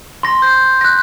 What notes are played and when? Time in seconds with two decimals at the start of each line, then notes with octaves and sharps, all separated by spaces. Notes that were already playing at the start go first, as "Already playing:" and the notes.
0.23 C6 A#6
0.42 G6
0.81 F#6 A#6